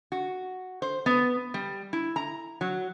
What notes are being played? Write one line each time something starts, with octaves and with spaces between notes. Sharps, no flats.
F#4
C5
B3
G3
E4
A#5
F#3